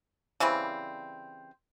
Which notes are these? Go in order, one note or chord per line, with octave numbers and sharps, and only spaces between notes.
C#3 E3 G3 C4